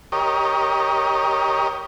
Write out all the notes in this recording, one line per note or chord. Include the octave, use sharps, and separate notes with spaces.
G4 A#4 C#5 D#5